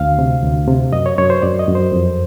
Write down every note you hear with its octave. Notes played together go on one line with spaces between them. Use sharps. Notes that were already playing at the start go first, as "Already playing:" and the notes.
Already playing: D2 F5
C3
D2
C3
F#2 D#5
C#5
F#2 C#5
C5
F#2 D5
D#5
F#2
C5
F2